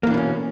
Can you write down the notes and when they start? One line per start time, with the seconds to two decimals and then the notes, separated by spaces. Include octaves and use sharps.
0.03 A#3
0.07 E3
0.10 D4
0.14 B2
0.17 C#4